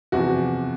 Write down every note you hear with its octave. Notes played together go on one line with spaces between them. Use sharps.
E2 C3 F3 F#4